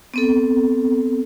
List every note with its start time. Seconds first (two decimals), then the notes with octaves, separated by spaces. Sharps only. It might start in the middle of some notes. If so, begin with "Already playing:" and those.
0.14 B3 C4 A4